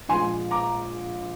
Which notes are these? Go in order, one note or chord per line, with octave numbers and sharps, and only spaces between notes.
A#1 A#2 G#3 G#5 C6
A#5 D6